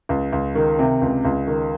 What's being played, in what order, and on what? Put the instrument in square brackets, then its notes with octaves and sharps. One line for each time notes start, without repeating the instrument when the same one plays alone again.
[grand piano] C#2
C#2
D#3
C3
C#2
C#2
D#3